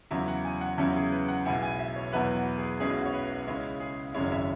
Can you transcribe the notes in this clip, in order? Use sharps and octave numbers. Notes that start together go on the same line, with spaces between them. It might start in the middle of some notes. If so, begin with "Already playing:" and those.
E2 C#3 F#3 E4 E5
F#5
G#5
F#5
E2 C#3 F#3 C#4 E4 E5
G#4
B4
F#5
B1 B2 G#3 B3 E4 G#5
G#5
E5
C#5
E2 B2 F#3 B3 E4 B4
F#4
G#4
B1 B2 G#3 C#4 E4 G#4
F#4
C#5
B4
C#5
C#2 C#3 G#3 E4 C#5
G#4
G#1 F#2 C#3 G#3 E4 C#5
E5